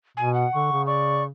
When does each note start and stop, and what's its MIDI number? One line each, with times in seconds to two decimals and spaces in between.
0.17 0.46 47
0.17 0.33 80
0.34 0.86 78
0.54 0.67 50
0.54 0.82 85
0.72 1.30 49
0.87 1.23 74
0.87 1.24 85